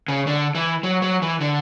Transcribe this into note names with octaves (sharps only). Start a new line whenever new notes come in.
C#3
D3
E3
F#3
F#3
E3
D3